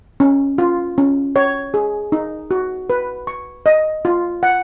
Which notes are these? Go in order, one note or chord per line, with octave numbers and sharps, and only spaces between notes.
C#4
F4
C#4
C#5
G#4
D#4
F#4
B4
C#6
D#5
F4
F#5